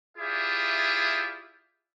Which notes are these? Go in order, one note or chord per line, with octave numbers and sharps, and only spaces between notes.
E4 F4 G4 G#4 D5 E5